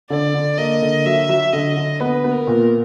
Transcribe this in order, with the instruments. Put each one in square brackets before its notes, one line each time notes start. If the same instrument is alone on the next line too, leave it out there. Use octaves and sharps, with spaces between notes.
[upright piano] D3 [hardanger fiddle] D5
[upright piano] D3
[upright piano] A#3 [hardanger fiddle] D#5
[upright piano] D3
[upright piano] F#3 [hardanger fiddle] E5
[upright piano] F#3
[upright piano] D3 [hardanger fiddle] D#5
[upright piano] D3
[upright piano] B3 [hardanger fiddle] B4
[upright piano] B3
[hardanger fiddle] A#4
[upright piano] A#2